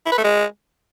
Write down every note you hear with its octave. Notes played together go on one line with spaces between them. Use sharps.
E4
B4
A3
G#3